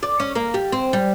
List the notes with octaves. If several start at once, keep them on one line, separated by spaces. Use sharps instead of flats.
D5
C#4
A#3
G3
C4
G3